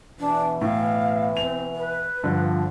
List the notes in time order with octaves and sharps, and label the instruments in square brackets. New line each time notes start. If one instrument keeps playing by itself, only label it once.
[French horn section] B2 E3 [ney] D4
[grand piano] A2 [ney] F5
[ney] C4 [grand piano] F7
[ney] B4
[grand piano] G2 D3 [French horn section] F3